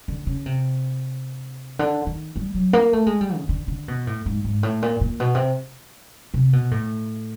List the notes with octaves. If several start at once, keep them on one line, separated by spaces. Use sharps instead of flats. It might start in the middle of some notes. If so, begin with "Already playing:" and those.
D3
C#3
C3
D3
D#3
G3
F#3
A#3
A3
G#3
G3
C#3
D3
D3
B2
A2
G#2
G#2
A2
A#2
A#2
B2
C3
C3
B2
A2